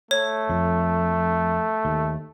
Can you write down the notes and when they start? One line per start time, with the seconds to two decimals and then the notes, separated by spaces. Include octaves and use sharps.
0.11 A3 C#5
0.49 F2
1.85 D#2